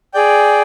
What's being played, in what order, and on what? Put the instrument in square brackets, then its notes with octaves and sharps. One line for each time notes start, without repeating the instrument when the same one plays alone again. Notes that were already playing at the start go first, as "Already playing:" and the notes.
[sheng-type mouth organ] G#4 D5 G5